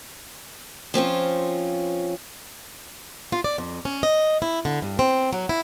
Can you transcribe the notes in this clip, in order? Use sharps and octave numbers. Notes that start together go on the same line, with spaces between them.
F3 C4 C#4 F4
F4
D5
F2
C#4
D#5
E4
D3
G2
C4
F#3
E4